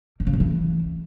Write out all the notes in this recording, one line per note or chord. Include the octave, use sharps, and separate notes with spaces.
D#3
C#3
F#2
E3